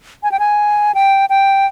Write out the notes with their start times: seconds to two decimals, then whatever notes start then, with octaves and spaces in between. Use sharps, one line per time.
0.23 G#5
0.32 G5
0.39 G#5
0.95 G5
1.30 G5